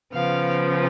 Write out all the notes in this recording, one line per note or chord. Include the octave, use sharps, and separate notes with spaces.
C#3 F3 B3 F5